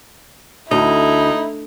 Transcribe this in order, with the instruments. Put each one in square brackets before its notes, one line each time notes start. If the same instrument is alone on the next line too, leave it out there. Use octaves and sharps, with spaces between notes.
[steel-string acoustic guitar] D2 [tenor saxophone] D#4 [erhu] E4